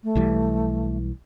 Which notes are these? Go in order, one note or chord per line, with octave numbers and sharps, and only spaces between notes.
A3
B1 E3 G3